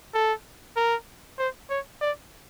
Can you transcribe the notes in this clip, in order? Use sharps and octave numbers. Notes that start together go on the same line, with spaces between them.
A4
A#4
C5
C#5
D5